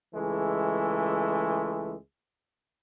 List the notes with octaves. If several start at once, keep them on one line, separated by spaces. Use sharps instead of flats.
C#2 E3 G#3 A3